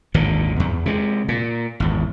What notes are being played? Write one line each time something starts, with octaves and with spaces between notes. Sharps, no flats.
G#1 D#2 A#2 D3
E2
C3 G#3
A#2
G#1 E2